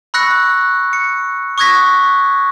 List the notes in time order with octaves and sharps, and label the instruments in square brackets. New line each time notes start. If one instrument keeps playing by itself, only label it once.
[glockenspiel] B5 C#6 E6 F#6 A#6 C#7
C#7
C#6 D#6 F#6 G#6 A#6 B6